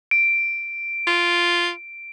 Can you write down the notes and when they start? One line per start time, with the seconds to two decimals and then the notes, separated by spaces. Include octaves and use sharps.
0.11 D7
1.07 F4